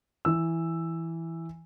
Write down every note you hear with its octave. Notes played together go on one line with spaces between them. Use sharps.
E3 E6